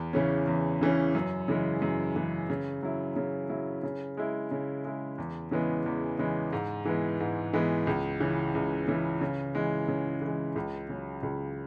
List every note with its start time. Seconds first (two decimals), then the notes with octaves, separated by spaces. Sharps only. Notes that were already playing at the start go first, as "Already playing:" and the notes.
Already playing: E2
0.13 C#3 E3 C#4
0.47 E2
0.81 C#3 E3 C#4
1.15 F#2
1.48 C#3 E3 G#3
1.82 F#2
2.16 C#3 E3 G#3
2.50 C#3
2.83 F#3 E4
3.16 C#3
3.49 F#3 E4
3.83 C#3
4.17 G#3 E4
4.51 C#3
4.85 G#3 E4
5.18 E2
5.51 C#3 E3 G#3 B3
5.86 E2
6.19 C#3 E3 G#3 B3
6.53 G#2
6.85 E3 G#3 B3
7.20 G#2
7.53 E3 G#3 B3
7.87 C#2
8.20 C#3 E3
8.55 C#2
8.88 C#3 E3
9.21 C#3
9.55 E3 G#3
9.88 C#3
10.22 E3 G#3
10.56 C#2
10.89 C#3 F#3
11.23 C#2